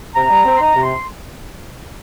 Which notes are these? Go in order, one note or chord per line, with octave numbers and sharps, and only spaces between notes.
C3 A#5
G3
C4
C6
D#4 A#5
C3
C6